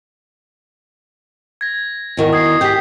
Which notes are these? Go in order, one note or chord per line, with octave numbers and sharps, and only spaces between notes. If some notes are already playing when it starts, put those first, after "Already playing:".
G#6 A#6
E2 D#3 F#4
D#6 G#6 C7
G4 G#4 G6 B6